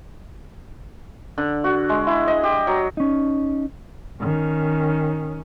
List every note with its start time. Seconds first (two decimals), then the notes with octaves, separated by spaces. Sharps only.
1.38 D3
1.64 F#4
1.89 G#3
2.07 E4
2.28 D#5
2.43 G4
2.67 F#3
2.97 C#4 D#4
4.20 D#3 C#4